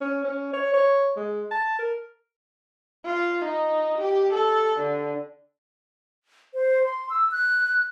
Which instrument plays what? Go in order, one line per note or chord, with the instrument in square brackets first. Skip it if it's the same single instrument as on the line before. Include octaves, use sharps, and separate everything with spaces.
[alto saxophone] C#4
C#4
C#5
C#5
G#3
A5
A#4
[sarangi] F4
D#4
G4
A4
D3
[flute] C5
C6
E6
F#6